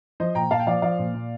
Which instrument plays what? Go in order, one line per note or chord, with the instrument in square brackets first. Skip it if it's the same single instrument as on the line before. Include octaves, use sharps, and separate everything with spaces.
[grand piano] F3 C5 D#5
A#2 G5 A#5
A#2 F5 A5
G5
F3 D5 F5
F3 D5 F5
A#2
A#2